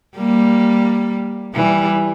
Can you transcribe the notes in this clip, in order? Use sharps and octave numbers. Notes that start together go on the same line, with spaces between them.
G3 A#3
E3 G3